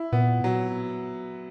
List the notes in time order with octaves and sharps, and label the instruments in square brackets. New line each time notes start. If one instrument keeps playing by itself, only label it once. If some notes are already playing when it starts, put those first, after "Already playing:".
Already playing: [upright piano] E4
[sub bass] A#2 [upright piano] B3
[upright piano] F#3